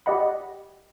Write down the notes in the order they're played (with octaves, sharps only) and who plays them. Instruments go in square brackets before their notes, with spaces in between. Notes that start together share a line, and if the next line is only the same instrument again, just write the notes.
[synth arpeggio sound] G4 D5 D#5 F#5 B5